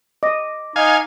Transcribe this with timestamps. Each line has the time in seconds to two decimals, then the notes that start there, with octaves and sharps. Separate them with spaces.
0.23 D#5 D6 A#6
0.76 D#4 F5 G#5